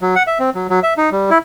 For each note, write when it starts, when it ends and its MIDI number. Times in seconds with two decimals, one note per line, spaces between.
0.01 0.15 54
0.16 0.23 78
0.27 0.38 76
0.39 0.50 60
0.55 0.67 54
0.70 0.80 54
0.83 0.94 76
0.97 1.10 63
1.12 1.30 55
1.30 1.38 64